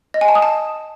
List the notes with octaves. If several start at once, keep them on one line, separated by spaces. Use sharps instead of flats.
D#5
G#5
A5
D#6
A5